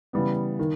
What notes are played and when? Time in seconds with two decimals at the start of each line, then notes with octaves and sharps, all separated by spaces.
0.13 C#3 E3 G3 B3
0.59 D#3